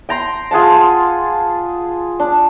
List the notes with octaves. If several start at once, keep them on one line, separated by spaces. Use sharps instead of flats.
G5 A#5 C6
F4 G#4 F#5 A5
D4